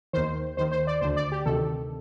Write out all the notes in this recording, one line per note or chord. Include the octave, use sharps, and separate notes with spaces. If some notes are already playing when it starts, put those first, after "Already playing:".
D#2 D#3 C5
D#2 D#3 C5
C5
D5
D2 D3 C5
D5
G4
D2 C3 D#3 A4